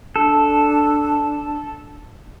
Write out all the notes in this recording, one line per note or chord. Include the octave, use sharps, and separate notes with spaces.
D4 A4